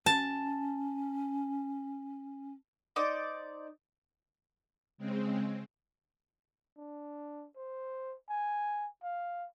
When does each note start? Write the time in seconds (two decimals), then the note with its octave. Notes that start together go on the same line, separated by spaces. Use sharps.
0.06 C#4 A5
2.96 D#4 C5 D5
4.98 C#3 G#3 C4
6.77 D4
7.57 C5
8.29 G#5
9.03 F5